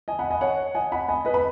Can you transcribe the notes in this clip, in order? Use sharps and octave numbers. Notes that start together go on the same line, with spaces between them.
D#5 G#5
F#5 B5
D#5 G#5
C#5 F#5
D#5 G#5
F#5 B5
D#5 G#5
B4 D#5
B5